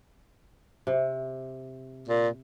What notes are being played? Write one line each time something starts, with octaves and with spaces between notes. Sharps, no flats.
C3
A#2